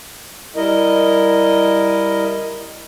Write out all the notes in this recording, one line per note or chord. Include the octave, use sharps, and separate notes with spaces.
G3 E4 A#4 D#5